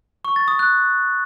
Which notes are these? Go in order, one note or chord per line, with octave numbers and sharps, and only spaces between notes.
C#6
A6
D#6
F#6